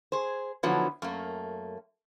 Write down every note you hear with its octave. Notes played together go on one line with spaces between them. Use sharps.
G#4 C5
D3 F3 F#3 B3 E4
F#2 A3 A#3